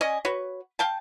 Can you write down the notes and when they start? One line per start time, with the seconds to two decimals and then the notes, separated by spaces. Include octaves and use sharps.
0.01 C#4 D5 D#5 G#5
0.25 F#4 B4 C#5
0.79 F5 G5 A5